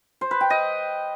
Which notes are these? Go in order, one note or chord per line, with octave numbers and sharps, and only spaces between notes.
C5
B4
G5
D#5